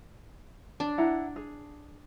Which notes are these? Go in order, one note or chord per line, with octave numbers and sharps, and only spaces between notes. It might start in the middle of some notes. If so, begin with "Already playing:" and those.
D4
E4 F#5 A#5
G#4